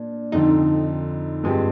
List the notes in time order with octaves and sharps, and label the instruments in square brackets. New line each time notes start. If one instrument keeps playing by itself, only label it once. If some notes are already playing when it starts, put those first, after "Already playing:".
Already playing: [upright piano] A#2 [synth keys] D4
[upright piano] F2 D3 F3 C4 F4 [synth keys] D#4
[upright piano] G2 F3 C4 G4 [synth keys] G#3